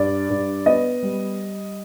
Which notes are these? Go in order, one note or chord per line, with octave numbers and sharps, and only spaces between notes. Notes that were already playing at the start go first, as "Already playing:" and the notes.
Already playing: G2 D5
G2
B3 D#5
G3